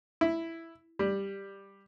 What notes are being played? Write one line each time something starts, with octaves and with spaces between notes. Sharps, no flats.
E4
G3